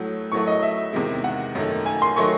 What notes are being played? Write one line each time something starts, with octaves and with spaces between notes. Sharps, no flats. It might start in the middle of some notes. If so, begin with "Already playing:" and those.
Already playing: A2 F#3 A3
A2 F#3 A3 C#6
D#5
E5
E2 C3 D#3 G#3
F#5
F#2 D#3 A3
G#5
C6
D#3 F#3 A3 C#6